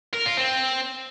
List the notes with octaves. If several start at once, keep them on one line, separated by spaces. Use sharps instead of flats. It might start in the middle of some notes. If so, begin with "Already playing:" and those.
A#4
F4
C4